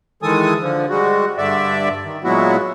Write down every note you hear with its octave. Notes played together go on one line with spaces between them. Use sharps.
D#3 E3 G#3 A4 G#5 D#6
D3 F3
G3 G#3 F#4
G2 D3 D5 E5
D#3
A#2 F#3 G#3 B3 E4 F#4